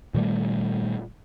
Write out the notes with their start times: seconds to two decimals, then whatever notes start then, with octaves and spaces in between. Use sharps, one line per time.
0.14 A#2 D#3 G3 A3